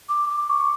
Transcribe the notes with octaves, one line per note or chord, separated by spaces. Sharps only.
D6
D6
C#6